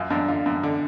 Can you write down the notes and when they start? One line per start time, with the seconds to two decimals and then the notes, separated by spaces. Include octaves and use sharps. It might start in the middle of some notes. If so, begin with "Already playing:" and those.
Already playing: F#2 F4
0.10 F#2 D4
0.28 D3 F4
0.46 F#2
0.63 D3